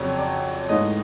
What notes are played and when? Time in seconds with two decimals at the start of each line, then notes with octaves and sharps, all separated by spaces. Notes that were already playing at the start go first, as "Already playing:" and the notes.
Already playing: F2 C#3 F#3 C#5 D5
0.18 D5
0.69 G#2 E3 A3 D#5